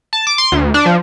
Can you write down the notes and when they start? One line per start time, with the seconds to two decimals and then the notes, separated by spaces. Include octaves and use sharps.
0.13 A5
0.27 D6
0.38 C6
0.52 D2
0.74 D4
0.86 F3